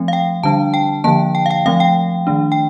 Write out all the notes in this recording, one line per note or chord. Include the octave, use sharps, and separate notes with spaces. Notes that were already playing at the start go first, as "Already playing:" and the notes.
Already playing: F3 A3 C4
F5
G5
D3 G3 D4 A5
G5
D3 F3 A#3 A5
G5
F5
G5
F3 A3 C4 F5
G5
D#3 A3 D4
G5